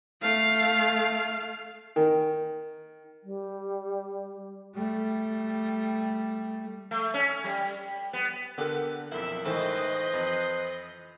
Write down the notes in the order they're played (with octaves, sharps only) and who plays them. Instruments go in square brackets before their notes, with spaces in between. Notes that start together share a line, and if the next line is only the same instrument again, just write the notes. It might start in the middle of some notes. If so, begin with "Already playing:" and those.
[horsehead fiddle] A3 F5
[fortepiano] D#3
[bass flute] G3
[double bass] G3 A3
[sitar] A3
C#4
G3
B3
[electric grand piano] D3 F#6 [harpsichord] B3 G4 A4 [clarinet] A#4
[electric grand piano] B1 F2 [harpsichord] E4 C6 [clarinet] A#4 [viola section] E5
[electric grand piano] C#2 A2 D#3 [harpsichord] E3 A4 [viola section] B4 D#5 [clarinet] C5
[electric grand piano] F2